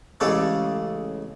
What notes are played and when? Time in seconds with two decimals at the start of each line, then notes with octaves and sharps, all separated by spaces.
0.20 A1 C#3 G#3 A4 C#5 D5